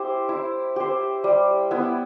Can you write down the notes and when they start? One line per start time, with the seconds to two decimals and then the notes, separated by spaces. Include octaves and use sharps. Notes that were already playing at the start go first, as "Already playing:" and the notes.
Already playing: E4 G4 C5
0.29 E4
0.76 G4 C5
1.24 G3
1.71 B3 E4